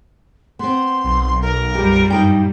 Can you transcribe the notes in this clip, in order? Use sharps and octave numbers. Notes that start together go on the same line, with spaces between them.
B3 C4 C6
B1
A#4
F#2 A#2 G3 G4
G2 D#4 G5